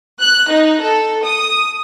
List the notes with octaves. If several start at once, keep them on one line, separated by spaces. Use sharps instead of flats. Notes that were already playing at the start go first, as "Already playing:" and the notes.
F#6
D#4
A4
D#6